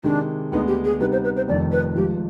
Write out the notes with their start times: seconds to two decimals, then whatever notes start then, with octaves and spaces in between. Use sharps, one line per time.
0.03 C3 D#3 G#3 D4
0.52 D2 D3 G#3 B3 D4 D#4
0.67 G4
0.84 G#4
1.00 C3 G3 B3 D#4 B4
1.12 C5
1.24 B4
1.36 C5
1.48 F1 F2 D#3 D5
1.71 B4
1.95 G#1 G#2 F3 G4